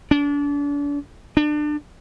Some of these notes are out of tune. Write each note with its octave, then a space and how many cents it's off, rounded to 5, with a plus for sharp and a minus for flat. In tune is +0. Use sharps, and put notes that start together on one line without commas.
D4 -35
D4 +25